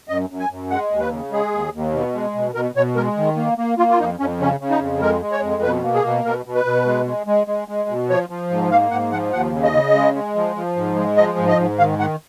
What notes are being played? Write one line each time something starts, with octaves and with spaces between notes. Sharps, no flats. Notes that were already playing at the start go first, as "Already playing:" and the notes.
F#2 D#5
F#2
G#5
F#2
G#3 F#5
D#2
B4
C#3
G#3 G#4
D#2
D#2
B2
G#3
B2
B2 A#4
B2 C#5
G#3 A#4
D#3
A#3
A#3
A#3 F4
F4
F2 D#4
F2 C#4
C#3 C#4
C#3
D#4
F2
G#3 A#4
G#3
C#5
F2
B2 B4
A#3
G#4
B2
B2 A#4
B2
B4
B2
G#3
G#3
G#3
G#3
G#3
B2
F3 C#5
F3
G#2
A#3 F5
G#2 F#5
F3 F#5
D#2 F#5
C#3
D#5
C#3
G#3
G#3
F3
F3
G#2
G#3
F3 D#5
G#2
D#5
G#2
D#3 F5
D#3 F#5